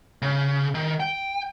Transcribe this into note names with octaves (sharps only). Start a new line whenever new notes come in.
C#3
D#3
G5